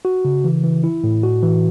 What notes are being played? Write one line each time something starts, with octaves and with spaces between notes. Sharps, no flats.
F#4
C#3
E3
E3
E4
A2
F#4
E3